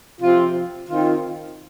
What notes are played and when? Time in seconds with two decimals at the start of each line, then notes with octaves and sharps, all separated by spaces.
0.21 C3 F3 C4 F4
0.90 D#3 C4 F4